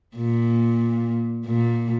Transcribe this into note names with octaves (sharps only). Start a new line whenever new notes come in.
A#2
A#2